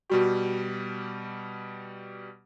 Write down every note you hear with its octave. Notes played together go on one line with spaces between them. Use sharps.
B2 G3 F#4 G4 C#6